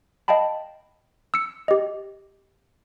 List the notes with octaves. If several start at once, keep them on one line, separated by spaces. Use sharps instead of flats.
D#5 F5 G5 A5 B5
E6 C#7
G4 D#5